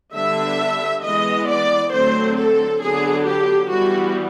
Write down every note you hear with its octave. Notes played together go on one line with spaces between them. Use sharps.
D3 G3 B3 D4 E5
E3 G#3 B3 D#5
D5
D3 F#3 A3 C4 C5
A4
D3 F#3 B3 D4 G#4
G4
E3 G3 B3 F#4